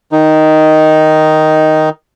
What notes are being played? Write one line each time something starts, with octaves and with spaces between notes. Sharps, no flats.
D#3 D#4